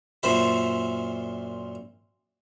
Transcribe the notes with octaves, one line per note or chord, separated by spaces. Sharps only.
F#2 A#2 C5 E5 B5